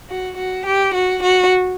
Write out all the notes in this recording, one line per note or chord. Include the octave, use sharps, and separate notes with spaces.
F#4
F#4
G4
F#4
F#4